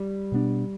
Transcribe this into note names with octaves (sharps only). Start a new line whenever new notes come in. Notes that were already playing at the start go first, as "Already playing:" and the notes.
Already playing: G3
B2 B3 D4